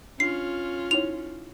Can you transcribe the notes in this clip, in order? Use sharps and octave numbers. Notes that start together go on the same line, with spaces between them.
C#4 D4 F4 C7
D#4 E4 C#5 F7